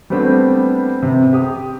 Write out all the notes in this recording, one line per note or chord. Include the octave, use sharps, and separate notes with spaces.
G3 A3 B3 C4 D4
C3
G4 D#6